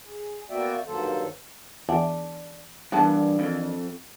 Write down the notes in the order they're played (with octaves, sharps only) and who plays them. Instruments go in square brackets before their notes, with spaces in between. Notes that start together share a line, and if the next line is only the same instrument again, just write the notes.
[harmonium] G#4
A#3 B3 F#4 D5 E5 G5
G2 D#3 F#3 A#3 A4 C5
[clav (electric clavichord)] E2 [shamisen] D4
[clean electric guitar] G2 [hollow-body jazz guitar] E3 A#3 D4 [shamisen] B3 F#5 A5
[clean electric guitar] F2